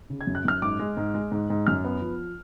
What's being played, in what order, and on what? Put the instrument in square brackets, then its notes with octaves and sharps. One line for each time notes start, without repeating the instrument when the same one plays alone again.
[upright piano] C#3
G#6
F#2
F#6
F#2 F6
G#2 D6
G#3
G#2
G#3
G#2
G#2
F#2 F6
B3
F3